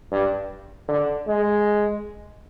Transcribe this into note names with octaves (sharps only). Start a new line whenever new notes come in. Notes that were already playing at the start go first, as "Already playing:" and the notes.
G2
D3
G#3